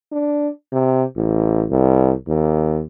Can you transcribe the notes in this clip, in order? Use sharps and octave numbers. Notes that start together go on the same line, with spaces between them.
D4
C3
A1
C2
D#2